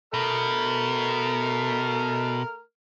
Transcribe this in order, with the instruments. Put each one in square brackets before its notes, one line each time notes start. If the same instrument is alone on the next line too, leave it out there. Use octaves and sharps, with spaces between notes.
[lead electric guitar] B2 [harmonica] A3 A#4 F6